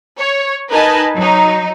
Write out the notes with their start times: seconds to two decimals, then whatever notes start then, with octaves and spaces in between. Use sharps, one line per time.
0.17 C#5
0.71 D#4 A#4 B4 D#5 G#5 A5
1.16 F#3 D#4